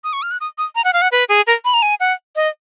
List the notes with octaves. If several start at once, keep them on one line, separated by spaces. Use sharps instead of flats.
D#6
C#6
F6
F#6
D#6
D#6
A#5
F#5
F5
F#5
B4
G#4
A#4
B5
A#5
G#5
F#5
D#5